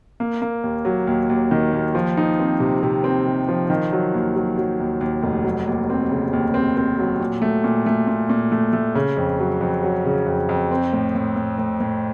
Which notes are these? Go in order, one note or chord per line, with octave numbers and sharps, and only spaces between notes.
A#3
A#3
D#2
F#3
D#2
D#2
D#3
D#2
F3
D#4
C4
C3
C3
C4
C3
F3
D#3
F#3
D#2
F#3
F#3
D#2
D#2
F1
F#3
D#2
C4
C#3
D#2
C4
C4
F#3
A#2
A3
A#2
A3
A#2
A#2
A3
A3
C#3
F2
F#3
F2
F#3
C#3
F2
F2
C4
A2
A2
A2
A2
A2